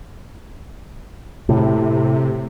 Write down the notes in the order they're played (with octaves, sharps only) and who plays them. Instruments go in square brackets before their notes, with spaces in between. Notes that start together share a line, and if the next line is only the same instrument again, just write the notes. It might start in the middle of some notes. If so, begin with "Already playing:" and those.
[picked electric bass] A2 [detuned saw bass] C3